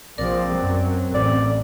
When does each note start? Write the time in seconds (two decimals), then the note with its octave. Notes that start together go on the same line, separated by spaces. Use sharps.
0.18 A#1 F3 C4 A#4 D5
0.54 F#2 F#3
1.14 A1 D5